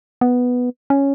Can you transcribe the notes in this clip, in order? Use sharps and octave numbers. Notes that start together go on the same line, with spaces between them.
B3
C#4